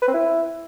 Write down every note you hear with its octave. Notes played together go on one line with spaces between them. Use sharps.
B4
C4
E4